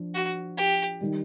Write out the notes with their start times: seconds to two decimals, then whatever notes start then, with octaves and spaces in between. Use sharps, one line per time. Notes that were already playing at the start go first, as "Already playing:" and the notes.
Already playing: F3 D4
0.14 F#4
0.57 G4
1.00 D#3 G3